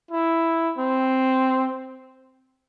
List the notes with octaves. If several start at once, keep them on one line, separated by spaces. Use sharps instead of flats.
E4
C4